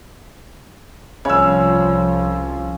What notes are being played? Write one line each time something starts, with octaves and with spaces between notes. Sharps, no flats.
C2 C#3 F3 C#5 E6